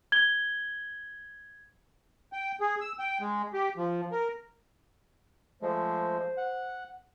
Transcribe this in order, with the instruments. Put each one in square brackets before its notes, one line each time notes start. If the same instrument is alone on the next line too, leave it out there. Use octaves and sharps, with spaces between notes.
[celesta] G#6 G7
[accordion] G5
G#4
E6
G5
G#3
G4
F3
A#4
[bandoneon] F3 G#3 A3 [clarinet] C5
[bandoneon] F#5